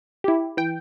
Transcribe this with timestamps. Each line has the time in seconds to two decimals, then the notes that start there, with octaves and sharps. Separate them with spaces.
0.24 E4 G4
0.57 E3 G5